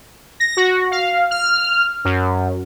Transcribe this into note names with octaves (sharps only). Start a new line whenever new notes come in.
A#6
F#4
F5
F6
F#2